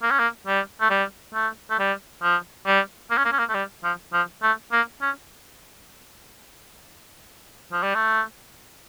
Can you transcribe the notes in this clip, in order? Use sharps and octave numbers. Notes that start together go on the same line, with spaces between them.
A#3
C#4
A#3
G3
A3
G3
A3
A3
G3
F3
G3
A#3
C#4
A#3
C#4
A#3
A3
G3
F3
F3
A3
A#3
C#4
F3
G3
A3